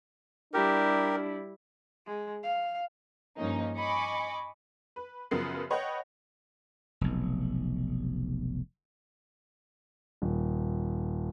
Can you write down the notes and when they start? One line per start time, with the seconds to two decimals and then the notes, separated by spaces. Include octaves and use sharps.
0.54 G3 D4 E4 G4 A#4
2.06 G#3
2.43 F5
3.37 G2 F3 A#3 C#4 D#4
3.76 D#5 G#5 B5 C#6 D6
4.96 B4
5.31 F#2 C#3 F3 B3 A#4 C7
5.70 B4 C#5 D#5 F#5 G5
7.01 F1 B1
10.22 D#1